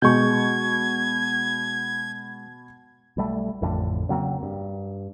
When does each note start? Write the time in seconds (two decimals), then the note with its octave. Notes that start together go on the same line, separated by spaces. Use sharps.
0.02 B2 G#3 C#6 G6 G#6
3.17 B1 G3 A3
3.61 A1 F2 A2 D3
4.09 C#3 F#3 A#3 C4
4.43 G2